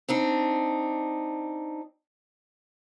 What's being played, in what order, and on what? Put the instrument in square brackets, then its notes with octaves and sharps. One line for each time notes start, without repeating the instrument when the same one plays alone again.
[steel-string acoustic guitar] C4 D4 D#4